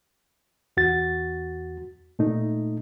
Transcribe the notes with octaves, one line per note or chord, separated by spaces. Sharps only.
E2 F#4 A6
A#2 A3 D#4